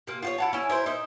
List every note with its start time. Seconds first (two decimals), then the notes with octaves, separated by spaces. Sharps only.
0.07 C3 A#3
0.22 F4 F#4 C#5
0.38 E4 F#5 A5
0.53 C#4 E4
0.70 E4 A#4 C5
0.86 D#4 E5